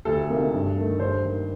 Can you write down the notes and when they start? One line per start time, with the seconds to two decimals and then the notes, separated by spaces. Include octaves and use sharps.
0.05 D2 A4
0.30 C3 D#3 A#3
0.54 G2
0.77 D#3 A3
1.00 G2 C5
1.23 D#3 A#3